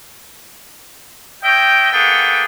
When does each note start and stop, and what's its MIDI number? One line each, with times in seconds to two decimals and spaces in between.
1.43 1.89 73
1.43 1.89 75
1.43 1.89 76
1.43 1.89 79
1.92 2.45 58
1.92 2.45 59
1.92 2.45 68
1.92 2.45 69
1.92 2.45 78
1.92 2.45 79